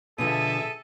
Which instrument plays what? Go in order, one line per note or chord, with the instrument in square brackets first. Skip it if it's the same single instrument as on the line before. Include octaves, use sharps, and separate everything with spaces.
[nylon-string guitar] B2 D3 F3 [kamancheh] G#4 E5 [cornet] A4 [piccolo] D#7